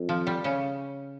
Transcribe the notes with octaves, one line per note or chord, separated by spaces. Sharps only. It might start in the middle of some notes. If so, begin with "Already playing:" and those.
Already playing: F2
F3
G3
C#3 C#4